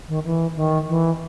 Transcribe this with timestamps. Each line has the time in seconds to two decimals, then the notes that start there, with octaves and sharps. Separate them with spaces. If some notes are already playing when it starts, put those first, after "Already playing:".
0.08 D#3
0.25 E3
0.56 D#3
0.88 E3